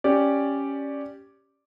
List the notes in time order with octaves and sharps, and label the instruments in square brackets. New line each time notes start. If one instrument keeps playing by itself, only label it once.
[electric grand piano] C#4 G4 D5